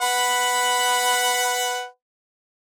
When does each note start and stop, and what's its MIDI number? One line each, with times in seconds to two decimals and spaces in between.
0.01 1.86 71
0.01 1.86 78
0.01 1.86 83